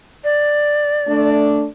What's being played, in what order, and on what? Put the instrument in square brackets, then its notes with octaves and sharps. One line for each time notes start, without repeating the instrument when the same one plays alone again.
[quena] D5
[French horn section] A3 D4